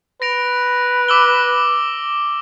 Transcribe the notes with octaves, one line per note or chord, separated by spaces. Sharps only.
B4 A#6 D7 F7
D6 E6 G7